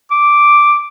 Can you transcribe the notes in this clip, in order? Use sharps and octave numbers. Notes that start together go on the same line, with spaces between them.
D6